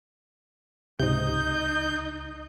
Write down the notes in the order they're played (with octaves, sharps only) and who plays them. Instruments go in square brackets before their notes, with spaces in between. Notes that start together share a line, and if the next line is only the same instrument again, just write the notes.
[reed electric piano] C#2 [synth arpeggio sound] G#2 C3 [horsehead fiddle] D#4 D#5 [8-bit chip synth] G6